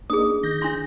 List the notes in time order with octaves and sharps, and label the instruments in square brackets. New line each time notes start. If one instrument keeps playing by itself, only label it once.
[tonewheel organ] A#3 D4 D#4 [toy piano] G#4 D#6
[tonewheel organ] D#3 G6 A#6
[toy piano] D4 C6